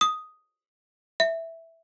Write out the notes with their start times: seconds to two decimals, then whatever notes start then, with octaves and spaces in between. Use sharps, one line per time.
0.01 D#6
1.20 E5